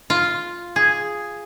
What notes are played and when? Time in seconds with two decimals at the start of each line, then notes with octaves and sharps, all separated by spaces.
0.10 F4
0.76 G#4